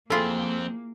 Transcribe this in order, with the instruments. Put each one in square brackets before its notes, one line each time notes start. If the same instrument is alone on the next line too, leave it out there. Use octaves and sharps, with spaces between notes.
[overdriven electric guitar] F2 C4 [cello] A#3 [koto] E4 F4 G#4 [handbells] A4